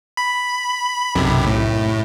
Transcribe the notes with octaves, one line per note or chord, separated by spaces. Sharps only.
B5
B1 F#2 C3
A2